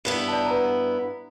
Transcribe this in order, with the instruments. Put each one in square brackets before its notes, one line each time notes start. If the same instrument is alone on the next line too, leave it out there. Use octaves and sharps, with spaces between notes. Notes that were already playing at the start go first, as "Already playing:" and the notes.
[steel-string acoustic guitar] G2 B3 E4
[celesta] D5 A5
B4 F#5 A#5